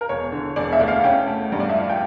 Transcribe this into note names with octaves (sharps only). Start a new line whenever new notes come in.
A#4
E1 C#5
D3
E1 D5
E5
D2
F5
C#4 G5
A3
G2
D5
E5
F3 F5
G5